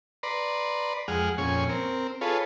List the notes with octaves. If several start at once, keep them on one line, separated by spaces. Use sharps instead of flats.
B4 D5 A#5 C6
F2 G#3 G#4 F#5 F6
F2 A#2 C#4 G#5 C#6
C4 A#4
F4 G#4 A4 B4 C#5